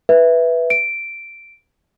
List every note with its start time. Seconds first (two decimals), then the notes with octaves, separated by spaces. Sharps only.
0.09 B4 E5
0.70 D7